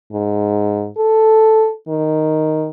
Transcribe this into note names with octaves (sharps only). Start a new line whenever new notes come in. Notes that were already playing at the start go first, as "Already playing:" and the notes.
G#2
A4
D#3